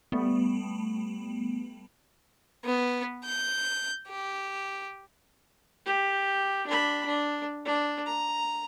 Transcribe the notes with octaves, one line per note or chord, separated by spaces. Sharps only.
G3 A3 B3
B3
G6
G4
G4
D4 B5
D4
D4
A#5